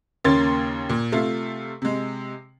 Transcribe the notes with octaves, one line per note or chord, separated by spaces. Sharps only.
D#2 C#3 A#3 C#4 C6 A6
A#2
C3 A3 F4
C3 G#3